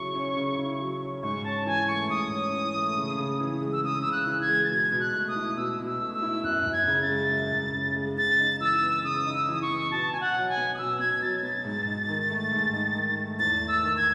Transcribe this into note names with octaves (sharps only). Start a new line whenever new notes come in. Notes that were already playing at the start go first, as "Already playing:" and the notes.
Already playing: C#3 F#3 E4 C#6
C#4
C#3
E4
F#3
C#4
G#2 C#6
C#4 A5
E3 G#5
A3 C#6
G#2 D#6
C#4
E3
A3
C#3
C#3
E3
G#3
E6
C#3 D#6
C#3 E6
F#6
E3
G#6
G#3
A6
B2 G#6
B2
F#6
A3
D#6
E4
B2 E6
B2
E6
A3
E6
E4
F#2 F#6
F#2
G#6
C#3
A6
G#3
F#2
F#2
C#3
G#3
C#3 A6
D#4
E3 E6
B3
C#3 D#6
D#4
E6
E3 D#6
C#6
B3
B2 A5
B2 G#5
F#5
F#3
G#5
B3
D#6
B2 E6
B2 G#6
F#3 A6
G#6
B3 A6
G#2
D#4
D#3
A3
G#2
D#4
D#3
A3
E2 A6
A3
E6
D#3
G#6